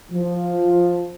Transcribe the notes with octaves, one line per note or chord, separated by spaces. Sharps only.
F3